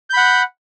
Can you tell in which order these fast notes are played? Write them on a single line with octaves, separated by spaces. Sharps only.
G6 B5 F#5